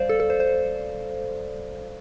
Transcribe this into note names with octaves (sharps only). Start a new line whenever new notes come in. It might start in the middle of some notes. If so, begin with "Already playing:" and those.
Already playing: G3 C5 D5 F5
A4
A4
C5
C5